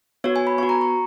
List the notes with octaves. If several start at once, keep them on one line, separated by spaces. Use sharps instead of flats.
B3 F#4 C#5
G#5
B5
B3 F#4 C#6
A#5
C#6